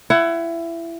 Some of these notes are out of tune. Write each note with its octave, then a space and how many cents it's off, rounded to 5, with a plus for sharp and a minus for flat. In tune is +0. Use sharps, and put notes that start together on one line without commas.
E4 +25 F#5 +25